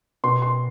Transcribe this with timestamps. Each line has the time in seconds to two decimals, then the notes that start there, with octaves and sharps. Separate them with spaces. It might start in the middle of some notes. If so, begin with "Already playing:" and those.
0.24 B2 C6
0.42 C6